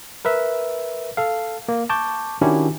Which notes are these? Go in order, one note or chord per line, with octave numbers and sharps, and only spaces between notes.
A#4 B4 E5
A4 F5
A#3
A5 C#6 D6 G6
D#3 C#4 D4 E4 F#4 G4